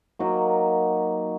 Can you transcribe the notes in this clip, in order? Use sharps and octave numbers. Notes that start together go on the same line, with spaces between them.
F#3 A#3 D#4 F#4